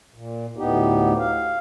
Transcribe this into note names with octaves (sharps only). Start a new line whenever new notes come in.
A#2
D2 A2 B3 D#4 G4
F5